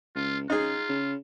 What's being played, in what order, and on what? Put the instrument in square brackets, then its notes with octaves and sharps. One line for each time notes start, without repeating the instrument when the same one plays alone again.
[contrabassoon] C#2 [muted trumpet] F4
[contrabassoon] C#3 [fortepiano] D#4 G#4 [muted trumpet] F4
[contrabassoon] C#3